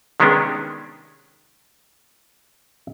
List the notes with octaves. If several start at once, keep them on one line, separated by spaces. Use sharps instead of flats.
C3 D#3 G#3 B3 C#4 D4